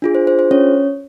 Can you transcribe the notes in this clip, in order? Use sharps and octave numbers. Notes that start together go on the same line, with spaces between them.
D4 F4 G#4
C5
C5
C5
C#4 C#5